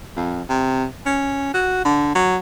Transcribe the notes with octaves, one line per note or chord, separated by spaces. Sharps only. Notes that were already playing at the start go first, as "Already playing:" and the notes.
F2
C3
C#4
F#4
D3
F#3